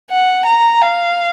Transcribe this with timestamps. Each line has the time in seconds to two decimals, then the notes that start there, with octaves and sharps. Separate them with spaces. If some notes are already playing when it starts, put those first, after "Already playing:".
0.11 F#5
0.46 A#5
0.81 F5